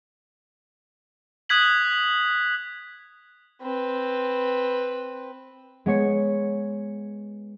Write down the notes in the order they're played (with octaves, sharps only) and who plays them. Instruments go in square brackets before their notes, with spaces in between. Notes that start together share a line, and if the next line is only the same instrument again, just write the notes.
[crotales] D#6 F#6 G#6 B6 F#7
[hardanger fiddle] C4 B4
[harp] G#3 B3 C#5 C#7